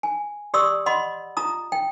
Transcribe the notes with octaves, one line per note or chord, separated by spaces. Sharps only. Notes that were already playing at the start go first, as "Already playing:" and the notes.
G#5
G4 D5 C6 D#6 E6
D#5 F#5 B5 C6
F4 A#5 D#6
G5